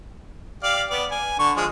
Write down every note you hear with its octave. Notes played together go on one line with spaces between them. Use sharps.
G4 D5 F5
B3 D5
G#5
D3 C#6
F3 G#3